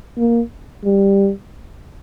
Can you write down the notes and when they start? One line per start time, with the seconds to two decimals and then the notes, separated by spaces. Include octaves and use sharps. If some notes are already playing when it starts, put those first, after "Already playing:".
0.18 A#3
0.84 G3